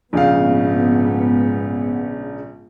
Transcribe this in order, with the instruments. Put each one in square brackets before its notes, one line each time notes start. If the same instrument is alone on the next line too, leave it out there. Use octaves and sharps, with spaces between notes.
[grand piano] A#1 C#3 F5 [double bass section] G#2 B3